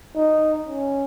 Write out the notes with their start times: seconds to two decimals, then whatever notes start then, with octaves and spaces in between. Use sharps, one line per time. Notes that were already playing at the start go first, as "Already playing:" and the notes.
0.16 D#4
0.69 C#4